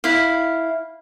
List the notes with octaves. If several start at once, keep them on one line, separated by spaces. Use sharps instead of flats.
E4 F5